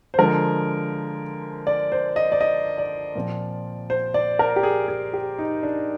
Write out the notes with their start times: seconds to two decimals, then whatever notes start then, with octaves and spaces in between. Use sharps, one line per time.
0.14 C5
0.18 D3 F3 G#3 A#4
1.67 D5
1.92 C5
2.16 D#5
2.32 D5
2.41 D#5
2.78 D5
3.15 A#2 F3 C4
3.90 C5
4.14 D5
4.39 A#4
4.56 G4
4.63 G#4
4.88 G#4
5.13 G4
5.39 D#4
5.63 D4